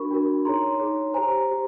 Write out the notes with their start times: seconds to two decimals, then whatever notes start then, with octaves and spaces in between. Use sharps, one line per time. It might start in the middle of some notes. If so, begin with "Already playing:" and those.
Already playing: D4 F#4 A#4 B5 C#6
0.11 D4 F#4 A#4
0.45 D#4 G#4 C#5 A#5 C6
0.80 D#4 G#4 C#5
1.14 G4 C5 G#5 A#5
1.49 G4 C5